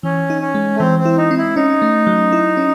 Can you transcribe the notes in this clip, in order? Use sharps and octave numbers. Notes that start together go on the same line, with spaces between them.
E3 C#4
D#4
C#4
G#3
A3
E3 C4
C4
E4
D#4
C4
E4
C#4 D#4
A3
F#3
E4
C#4